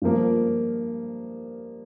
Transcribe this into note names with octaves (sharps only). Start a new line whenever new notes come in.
G2 F3 A#3